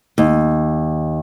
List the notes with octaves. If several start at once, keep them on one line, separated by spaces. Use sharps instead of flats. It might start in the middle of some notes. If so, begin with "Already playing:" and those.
D#2